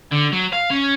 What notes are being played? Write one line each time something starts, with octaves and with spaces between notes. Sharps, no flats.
D3
F#3
F5
C#4